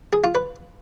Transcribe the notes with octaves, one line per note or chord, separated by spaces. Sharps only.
G#4
F4
B4